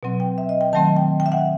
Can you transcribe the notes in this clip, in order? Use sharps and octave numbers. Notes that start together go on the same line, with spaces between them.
B2 F#3 C4
G5
E5
D#5
G5
D#3 F#3 A3 C4 A5
G5
G5
E5
F#5